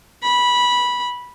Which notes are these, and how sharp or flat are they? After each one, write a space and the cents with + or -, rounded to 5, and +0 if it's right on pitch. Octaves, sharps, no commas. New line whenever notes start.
B5 -15